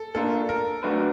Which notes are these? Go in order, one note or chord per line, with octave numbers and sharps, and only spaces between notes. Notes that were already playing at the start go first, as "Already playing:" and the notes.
Already playing: A4
A#3 D4 F4 A4 A#4
A#4
F#3 A3 D4 F#4 B4